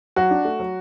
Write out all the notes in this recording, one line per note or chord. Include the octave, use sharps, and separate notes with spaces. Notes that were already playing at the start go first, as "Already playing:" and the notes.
F#3 F#4
D4
A3
F#3